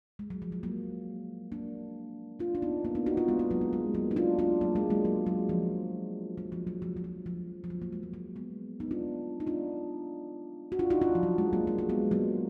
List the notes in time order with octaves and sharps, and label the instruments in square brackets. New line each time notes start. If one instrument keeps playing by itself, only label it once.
[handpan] G#3
F#3
F3
F#3
F#3 A#3
A#3 D4
D4 F4
D4
B3 D#4
A#3 D4
B3 D#4
D#4 F#4
D4 F4
G#3 B3
G#3 B3
F#3 A#3
F#3
G#3
F#3 A#3
D#4
D4 F4
D4 F4
F#3 A#3
G#3
F#3 A#3
F#3
F#3
F3
F#3
F3
F#3
F3
F3
F#3
F3
F3
F#3
F#3 A#3
G#3
F3
F#3
G#3 B3
B3 D#4
D4 F4
D#4
D4 F4
F#4
D4 F4
D#4 F#4
D4 F4
F3
F#3
G#3
F#3 A#3
G#3
G#3
G#3 B3
F#3 A#3